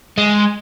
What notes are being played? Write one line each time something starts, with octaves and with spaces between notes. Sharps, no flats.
G#3